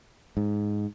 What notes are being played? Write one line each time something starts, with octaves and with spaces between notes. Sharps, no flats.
G#2